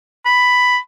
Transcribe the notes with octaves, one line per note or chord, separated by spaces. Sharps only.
B5